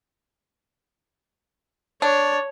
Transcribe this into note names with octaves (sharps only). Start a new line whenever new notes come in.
D4 C#5